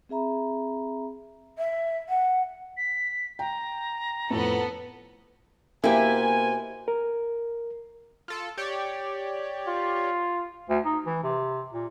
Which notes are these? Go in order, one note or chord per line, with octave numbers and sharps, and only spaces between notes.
C4 G#4 E5 A#5 B5
E5
F#5
B6
G5 A#5
F2 A2 B3 A4
B2 A#3 E4 G4 C5 G#5
A#4
F4 A4
G4 C#5 D5
F4
D2
D#4
E3
C3
A#2